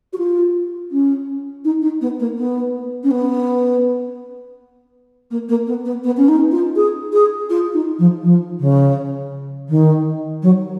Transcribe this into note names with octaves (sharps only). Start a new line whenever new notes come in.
F#4
F4
C#4
D#4
D#4
B3
A#3
B3
C#4
B3
A#3
A#3
B3
B3
B3
C#4
D#4
F4
G#4
G#4
F4
D#4
F3
F3
C#3
D#3
F#3